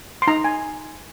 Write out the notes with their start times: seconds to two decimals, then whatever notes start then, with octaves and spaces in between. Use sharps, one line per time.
0.22 C6
0.27 D#4 A#5
0.44 G#5